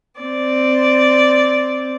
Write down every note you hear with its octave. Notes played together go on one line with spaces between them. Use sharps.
C4 D5